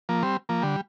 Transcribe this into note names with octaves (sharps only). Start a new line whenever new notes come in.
F3 A#3
G3 C4
F3 A#3
D3 G3